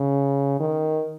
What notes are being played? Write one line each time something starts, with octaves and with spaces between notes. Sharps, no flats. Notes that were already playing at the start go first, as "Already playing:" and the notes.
Already playing: C#3
D#3